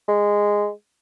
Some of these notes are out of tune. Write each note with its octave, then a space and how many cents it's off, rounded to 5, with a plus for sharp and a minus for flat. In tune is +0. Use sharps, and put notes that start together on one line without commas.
G#3 -10